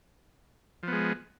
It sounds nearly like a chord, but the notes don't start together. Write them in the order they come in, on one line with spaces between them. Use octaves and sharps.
F3 B3 G#3